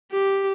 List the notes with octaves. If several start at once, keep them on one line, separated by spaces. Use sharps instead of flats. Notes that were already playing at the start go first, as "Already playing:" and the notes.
G4